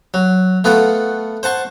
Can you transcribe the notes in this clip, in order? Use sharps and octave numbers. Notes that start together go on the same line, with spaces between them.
F#3
A3 B3 F4 F#5
C5 F#5 A5 C6 C#6